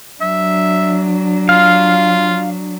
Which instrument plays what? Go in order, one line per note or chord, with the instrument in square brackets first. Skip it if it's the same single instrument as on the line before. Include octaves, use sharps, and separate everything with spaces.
[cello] F#3 D4 [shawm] E5
[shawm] F4 [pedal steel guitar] F5